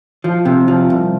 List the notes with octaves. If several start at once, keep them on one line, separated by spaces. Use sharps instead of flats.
F3
C3
F3
C2